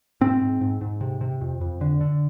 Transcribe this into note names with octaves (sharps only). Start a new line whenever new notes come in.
G#2 C4
G#2
G#2
G#2
C3
C3
F2
F2
D3
D3